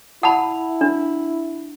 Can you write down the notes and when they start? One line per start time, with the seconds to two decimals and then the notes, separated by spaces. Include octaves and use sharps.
0.23 E4 F#5 A5 B5
0.81 D4